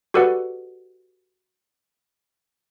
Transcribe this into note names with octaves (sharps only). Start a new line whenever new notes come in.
F#4 G4 A4 B4 D5 F#5